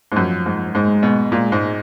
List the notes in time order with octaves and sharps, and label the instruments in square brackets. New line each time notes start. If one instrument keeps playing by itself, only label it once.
[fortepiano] G#2
[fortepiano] F#2 [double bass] F3
[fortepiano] G#2
[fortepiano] G#2 [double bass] G#3
[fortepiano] B2
[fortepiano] A#2 [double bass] G#3
[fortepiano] G#2